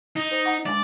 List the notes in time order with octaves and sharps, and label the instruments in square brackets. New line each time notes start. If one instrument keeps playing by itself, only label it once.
[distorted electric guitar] D#4
[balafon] C5
F#5 A#5
[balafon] G#3 D4 [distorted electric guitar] D5